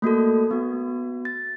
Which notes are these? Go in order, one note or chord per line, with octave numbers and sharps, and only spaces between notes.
A3 A#3 F#4 A4
B3 F#4
A6